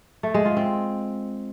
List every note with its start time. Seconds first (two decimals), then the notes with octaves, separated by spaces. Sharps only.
0.23 A3
0.34 G#3
0.46 F4
0.57 C4